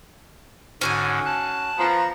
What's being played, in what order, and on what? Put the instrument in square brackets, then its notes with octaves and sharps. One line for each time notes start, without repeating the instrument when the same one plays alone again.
[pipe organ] G#2 D3 [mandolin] C#4 F#4 G#5
[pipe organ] A5 F#6
[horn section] F3 B3 [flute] A#5